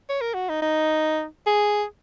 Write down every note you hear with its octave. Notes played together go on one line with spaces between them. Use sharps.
C#5
A#4
F#4
D#4
D#4
G#4